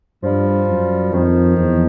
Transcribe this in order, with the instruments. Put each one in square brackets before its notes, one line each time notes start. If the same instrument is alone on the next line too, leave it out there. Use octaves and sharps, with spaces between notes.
[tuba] G2 [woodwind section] F3 G3
[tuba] F#2
[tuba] F2 [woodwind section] D#3 F3
[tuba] E2